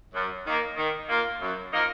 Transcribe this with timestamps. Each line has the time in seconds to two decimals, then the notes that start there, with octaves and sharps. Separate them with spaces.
0.14 F#2
0.45 D#3 A#3
0.76 D#3
1.09 A#3 F4
1.40 F#2
1.72 F3 A#3 D#4 A#4